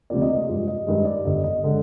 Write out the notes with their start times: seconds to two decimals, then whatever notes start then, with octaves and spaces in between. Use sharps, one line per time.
0.10 D2 C3 F3 A#3 D5
0.22 D#5
0.34 D5
0.48 G2 F3 G#3 D#5
0.68 D#5
0.87 G2 D#3 G#3 D#5
1.05 D5
1.25 G1 G2 D3 D#5
1.44 D#5
1.63 D3 G#3